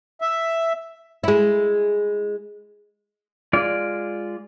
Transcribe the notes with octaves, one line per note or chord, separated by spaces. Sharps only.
E5
G#3 E4
G#3 F4 D5